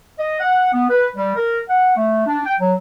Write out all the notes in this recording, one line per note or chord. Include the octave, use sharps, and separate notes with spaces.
D#5
F#5
B3
B4
G3
A#4
F#5
A3
D4
G5
F#3